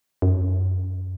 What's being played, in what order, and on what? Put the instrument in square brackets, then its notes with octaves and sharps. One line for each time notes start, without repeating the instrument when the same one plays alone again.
[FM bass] F#2